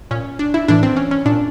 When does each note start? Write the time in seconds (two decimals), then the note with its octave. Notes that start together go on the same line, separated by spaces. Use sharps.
0.11 A#2 C#4
0.39 D4
0.54 E4
0.68 A2 E3 D4
0.83 C4
0.97 C#4
1.11 C#4
1.26 A#2 D4